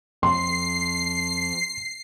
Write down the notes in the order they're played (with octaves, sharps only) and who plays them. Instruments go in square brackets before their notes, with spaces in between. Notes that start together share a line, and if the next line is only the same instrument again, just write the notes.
[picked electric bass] F2 [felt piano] C6 [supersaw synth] C7